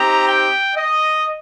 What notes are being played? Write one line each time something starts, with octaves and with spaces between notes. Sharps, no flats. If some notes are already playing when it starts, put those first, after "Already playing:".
Already playing: C4 D#4 G4 A#5
G5
D#5